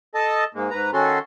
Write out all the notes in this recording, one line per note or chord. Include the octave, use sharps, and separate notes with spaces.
A4 D#5 A5
G#2 G#3 A#3
G#2 B4 A#5
D#3 C#4 F#4 A4 C6